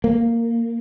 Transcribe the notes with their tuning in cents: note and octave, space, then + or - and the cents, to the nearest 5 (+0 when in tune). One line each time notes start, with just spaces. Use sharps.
A#3 -10